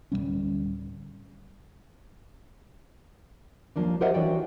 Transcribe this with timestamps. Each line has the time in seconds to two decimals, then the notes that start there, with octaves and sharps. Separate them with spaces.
0.12 D1 G#2 G3 C#4
3.76 D#2 F3 A#3 D4
4.01 G4 A#4 C5 D#5 E5 F#5
4.14 E3 D4 F#4 C#5 D5 G5